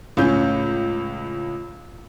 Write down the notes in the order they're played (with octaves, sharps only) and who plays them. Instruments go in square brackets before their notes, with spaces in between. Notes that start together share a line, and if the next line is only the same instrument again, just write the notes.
[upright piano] C#2 A2 C#4 G6